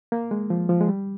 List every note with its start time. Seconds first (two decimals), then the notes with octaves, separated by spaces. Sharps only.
0.12 A#3
0.31 G#3
0.50 F3
0.69 F3
0.81 G#3
0.88 G3